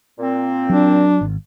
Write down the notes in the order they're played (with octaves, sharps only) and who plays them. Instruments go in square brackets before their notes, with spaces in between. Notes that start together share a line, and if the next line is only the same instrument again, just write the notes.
[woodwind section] A#2 C4
[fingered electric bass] F#3 [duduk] D4
[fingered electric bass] G#1